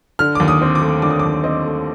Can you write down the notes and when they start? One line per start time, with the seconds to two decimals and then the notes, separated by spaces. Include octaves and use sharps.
0.19 D3 F6
0.35 D#2 D6
0.48 D#6
0.62 C4
0.75 D6
0.82 A3
1.02 D3 D6
1.11 D#6
1.20 D6
1.24 D#2
1.44 C4 D#5
1.65 A3